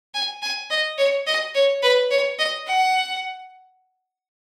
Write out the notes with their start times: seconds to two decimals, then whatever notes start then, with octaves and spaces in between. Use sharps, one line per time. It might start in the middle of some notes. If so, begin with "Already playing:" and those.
0.14 G#5
0.42 G#5
0.70 D#5
0.98 C#5
1.27 D#5
1.55 C#5
1.82 B4
2.11 C#5
2.39 D#5
2.67 F#5